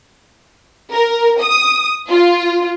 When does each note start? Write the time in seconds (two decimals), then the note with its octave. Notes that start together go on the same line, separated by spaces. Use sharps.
0.92 A#4
1.41 D#6
2.09 F4